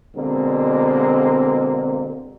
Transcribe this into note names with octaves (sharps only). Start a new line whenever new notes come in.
B2 D3 G#3 A#3 C4